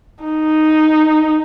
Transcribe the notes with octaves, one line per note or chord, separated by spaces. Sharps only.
D#4